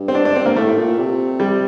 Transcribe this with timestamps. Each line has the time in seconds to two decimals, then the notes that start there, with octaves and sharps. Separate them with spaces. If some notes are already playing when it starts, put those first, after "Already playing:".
Already playing: G2
0.08 C4
0.15 D4
0.25 D4
0.35 C4
0.46 A#3
0.56 A2 A3
0.77 A#2
0.99 C3
1.40 G3